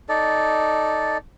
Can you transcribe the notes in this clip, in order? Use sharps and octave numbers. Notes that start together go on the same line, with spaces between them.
D#4 A4 D5